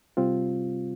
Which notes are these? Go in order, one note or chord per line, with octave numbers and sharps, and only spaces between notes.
C3 G3 C4 F4